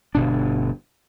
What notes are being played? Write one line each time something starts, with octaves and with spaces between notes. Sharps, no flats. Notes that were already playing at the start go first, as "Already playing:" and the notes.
G1 B2 D4